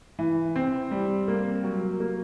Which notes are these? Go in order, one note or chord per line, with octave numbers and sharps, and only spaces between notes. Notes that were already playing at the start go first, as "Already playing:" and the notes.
E3
C4
G3
A#3
F#3
A#3